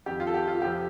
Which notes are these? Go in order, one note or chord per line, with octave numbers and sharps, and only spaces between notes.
F2 D#3 G4
F4
A4
G4
F4
F2 C3 F3 G4